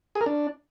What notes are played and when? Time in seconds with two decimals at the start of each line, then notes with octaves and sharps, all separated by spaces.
0.15 G#4
0.21 A#4
0.26 D4